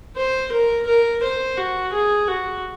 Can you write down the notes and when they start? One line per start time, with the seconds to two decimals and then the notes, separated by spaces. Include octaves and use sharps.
0.17 C5
0.52 A#4
0.87 A#4
1.23 C5
1.57 F#4
1.93 G#4
2.28 F#4